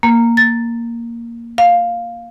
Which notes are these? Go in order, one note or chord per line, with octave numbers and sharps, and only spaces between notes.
A#3
A6
F5